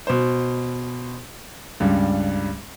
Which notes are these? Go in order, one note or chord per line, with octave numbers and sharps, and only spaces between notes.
B2 C5
C#2 G2 G3